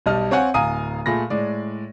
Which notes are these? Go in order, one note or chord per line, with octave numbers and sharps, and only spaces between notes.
B1 G3 D#5 A5 F6
C4 C#5 F5 F#5 G#5
D1 F5 G#5 A#5 D#6 D#7
A#2 A3 G#4 B5 A#6
A2 G#3 D5